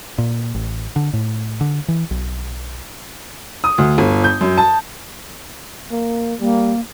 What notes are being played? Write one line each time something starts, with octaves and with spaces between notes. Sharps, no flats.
A#2
A1
D3
A2
D3
E3
B1
D#6
D2
G1
G6
F#2
A5
A#3
G3 A#3